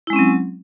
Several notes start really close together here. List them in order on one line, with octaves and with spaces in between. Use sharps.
E4 G#3 C#4 C4 F#3